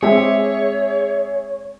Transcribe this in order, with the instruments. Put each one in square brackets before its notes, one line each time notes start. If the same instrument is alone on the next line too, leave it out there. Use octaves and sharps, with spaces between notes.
[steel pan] G#3 C4 G4 [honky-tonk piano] G#4 E5 [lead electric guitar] C#5